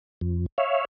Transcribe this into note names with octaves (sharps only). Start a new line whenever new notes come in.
F2
C#5 E5 F5